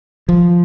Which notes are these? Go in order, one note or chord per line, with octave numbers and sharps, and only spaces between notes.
F3